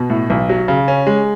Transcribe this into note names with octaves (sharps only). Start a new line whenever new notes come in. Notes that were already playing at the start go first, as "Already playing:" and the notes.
Already playing: B2
A2
B1
F#3
C#3
C#4
G#3